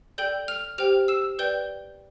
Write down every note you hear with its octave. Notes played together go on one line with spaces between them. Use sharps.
A4 D5 G5 G6 G7
F6 F7
G4 C5 G5 F6 F7
E6 E7
B4 D5 G5 G6 G7